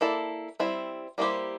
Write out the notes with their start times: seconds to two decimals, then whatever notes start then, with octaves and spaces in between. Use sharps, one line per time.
0.01 A#3 E4 A4 D5
0.60 G3 C4 E4
1.18 G3 A#3 E4 G4 C5